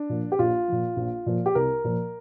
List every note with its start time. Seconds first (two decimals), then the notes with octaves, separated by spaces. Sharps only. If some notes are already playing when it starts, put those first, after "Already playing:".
Already playing: D4
0.10 A#2 F3
0.32 G4
0.39 A#1 F4
0.68 A#2 F3
0.97 A#1
1.26 A#2 F3
1.46 G4
1.55 C2 A#4
1.85 A#2 F3